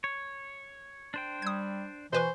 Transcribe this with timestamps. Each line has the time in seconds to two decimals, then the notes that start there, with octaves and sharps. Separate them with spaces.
0.04 C#5
1.14 D4 C5 G5
1.42 G3 D#6 G#6
2.13 B2 E3 B4 C5 C#6